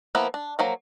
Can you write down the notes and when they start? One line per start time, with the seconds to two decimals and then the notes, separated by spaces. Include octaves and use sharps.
0.15 F3 A#3 B3 E4
0.34 D4
0.59 F3 F#3 A#3